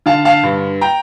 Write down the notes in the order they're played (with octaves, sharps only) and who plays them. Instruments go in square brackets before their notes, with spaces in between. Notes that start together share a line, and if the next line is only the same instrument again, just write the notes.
[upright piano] D3 F5 A5
F5 A5
G2
G5 A#5